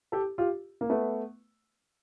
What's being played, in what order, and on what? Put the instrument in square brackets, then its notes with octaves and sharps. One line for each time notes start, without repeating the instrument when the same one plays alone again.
[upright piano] G4 A4
F4 G4
A#3
A3 B3